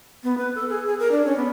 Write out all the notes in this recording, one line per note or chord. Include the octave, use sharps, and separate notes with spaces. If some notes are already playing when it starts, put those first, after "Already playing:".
B3
B4
A4
G#4
G#4
A#4
D4
C#4
B3